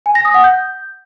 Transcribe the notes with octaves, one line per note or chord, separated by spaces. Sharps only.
G#5
A#6
D#6
F#5
G6